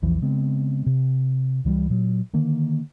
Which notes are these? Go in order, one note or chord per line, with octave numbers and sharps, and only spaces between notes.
A#1 E2 E3 F3
C#3 G#3 B3 C4
C3
C#2 E3 F#3 G3
A#2 F#3
D3 D#3 A#3